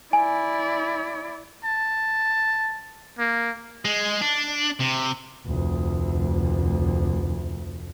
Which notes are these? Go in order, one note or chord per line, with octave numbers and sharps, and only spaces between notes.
E4 D5 G#5
A5
A#3
G#3
D4
C3
F1 D2